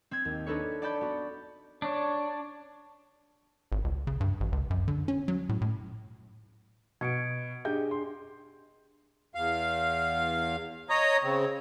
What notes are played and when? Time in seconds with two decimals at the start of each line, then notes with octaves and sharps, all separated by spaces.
0.11 C4 G#6
0.25 D#2
0.46 D4 D#4 A4 B4 C#5
0.82 D5 F#5 A5 B5 G6 A6
1.01 B3 F#4
1.82 D4 C#5
3.72 G#1
3.84 C#2
4.07 C#3
4.20 G2
4.40 A1
4.52 C#2
4.70 F#2
4.88 D3
5.08 C#4
5.28 F#3
5.49 A2
5.61 A2
7.01 B2 G#6 C#7 D7
7.65 D4 G4 G#4 D#5 G6
7.91 C6
9.35 E2 F5
10.90 C#5 D#5 A#5 D#6
11.23 C#3 C4